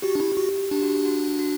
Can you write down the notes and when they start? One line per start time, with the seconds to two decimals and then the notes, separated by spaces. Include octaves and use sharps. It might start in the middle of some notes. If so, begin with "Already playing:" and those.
0.02 F#4 G4
0.15 D4
0.20 E4
0.37 F#4
0.71 D4 G4
0.82 F#4
1.05 F#4
1.39 F#4